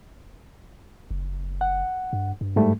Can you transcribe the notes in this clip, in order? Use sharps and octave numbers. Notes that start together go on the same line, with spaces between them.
F#1
F#5
G2
G2
G#2 G3 A3